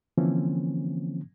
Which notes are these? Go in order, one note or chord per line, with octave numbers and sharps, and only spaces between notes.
D3 E3 F3 A#3 C4 C#4